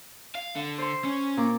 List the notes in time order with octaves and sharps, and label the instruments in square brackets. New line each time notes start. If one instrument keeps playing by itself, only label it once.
[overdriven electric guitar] F5
D3
[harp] C5 C6
[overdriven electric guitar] C#4
[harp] A#2 D6